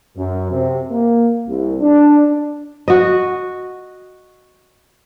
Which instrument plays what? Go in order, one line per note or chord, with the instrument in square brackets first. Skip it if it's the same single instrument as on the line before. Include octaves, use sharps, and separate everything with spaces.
[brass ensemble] F#2
C3
A#3
C2
D4
[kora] F#4 D#5